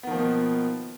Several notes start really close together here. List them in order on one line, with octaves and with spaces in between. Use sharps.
B3 D#3 F3 A#3 B2